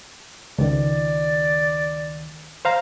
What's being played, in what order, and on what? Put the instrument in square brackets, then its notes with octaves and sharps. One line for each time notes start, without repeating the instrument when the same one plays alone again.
[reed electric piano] C#2 D#3 [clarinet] D5
[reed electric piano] C5 F5 A#5